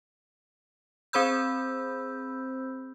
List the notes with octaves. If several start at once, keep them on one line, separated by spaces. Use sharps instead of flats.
C4 G#4 C5 B5 E6 G6